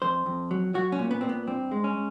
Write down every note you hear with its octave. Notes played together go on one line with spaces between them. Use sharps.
F2 C5
F2
F#3
F#3 F#4
C#4
A#2
B3
A#2 C4
B3
G2 C4
G#3
C#4